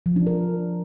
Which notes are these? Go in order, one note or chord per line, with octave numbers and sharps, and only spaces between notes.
F3
D4
A#4